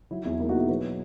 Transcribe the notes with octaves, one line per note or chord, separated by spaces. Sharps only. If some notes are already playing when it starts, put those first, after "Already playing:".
F#3 E4
E2 E4
A#3 E4
D#4 F#4
B2 E4 G#4
F#3 G#4 B4